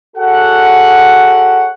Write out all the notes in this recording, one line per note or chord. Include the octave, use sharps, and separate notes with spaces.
F#4 G#4 A4 C#5 F#5